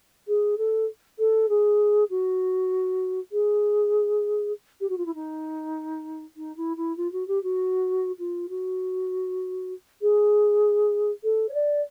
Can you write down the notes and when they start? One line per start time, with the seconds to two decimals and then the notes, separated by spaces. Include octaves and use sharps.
0.27 G#4
0.57 A4
1.18 A4
1.49 G#4
2.10 F#4
3.32 G#4
4.80 G4
4.89 F#4
4.97 F4
5.05 E4
5.14 D#4
6.36 D#4
6.56 E4
6.76 E4
6.96 F4
7.12 F#4
7.27 G4
7.43 F#4
8.18 F4
8.49 F#4
10.01 G#4
11.23 A4
11.48 C#5
11.53 D5